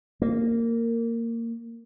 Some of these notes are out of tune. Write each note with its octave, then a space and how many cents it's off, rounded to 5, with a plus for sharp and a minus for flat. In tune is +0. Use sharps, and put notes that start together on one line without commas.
A#3 -15